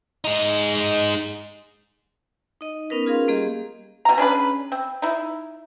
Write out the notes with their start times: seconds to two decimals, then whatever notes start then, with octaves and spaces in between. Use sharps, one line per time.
0.24 G#3 D#4
2.61 D#4 D#5
2.90 B3 C#4 D#4 A#4 B4
3.06 C#4 F4 G#4 A#4 F5 C6
3.28 G3 A#3 G4 G#4 D#5
4.05 B2 A#5
4.18 C#4 D4 G#4 B4
4.72 C4
5.02 D#4 E4